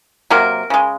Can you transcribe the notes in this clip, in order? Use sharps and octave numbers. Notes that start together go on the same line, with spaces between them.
C3 F#3 A#3 A#4
C#3 G#3